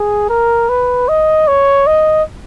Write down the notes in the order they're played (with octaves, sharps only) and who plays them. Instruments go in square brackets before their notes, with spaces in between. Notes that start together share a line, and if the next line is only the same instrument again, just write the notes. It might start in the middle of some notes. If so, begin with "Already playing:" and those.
Already playing: [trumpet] G#4
A#4
B4
D#5
C#5
D#5